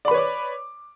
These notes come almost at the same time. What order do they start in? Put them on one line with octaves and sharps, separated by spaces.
D5 B5 B4 C#5 D6